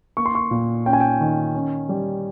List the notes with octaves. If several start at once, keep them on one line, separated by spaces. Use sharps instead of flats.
A#3 C#6
C6
C#6
A#2
C#4 G5
G#5
G5
D#3
C#4
G3